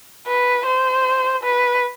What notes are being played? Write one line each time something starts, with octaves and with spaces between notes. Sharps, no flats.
B4
C5
B4